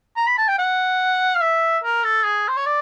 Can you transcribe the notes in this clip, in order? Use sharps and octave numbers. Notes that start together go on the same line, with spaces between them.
A#5
B5
A5
G5
F#5
F5
E5
A#4
A4
G#4
C5
C#5
D5